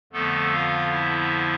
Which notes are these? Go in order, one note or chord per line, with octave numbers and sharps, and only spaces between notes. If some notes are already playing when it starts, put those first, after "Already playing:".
F2 D3 F3 A3 B3 A4
F4 F5
E4 E5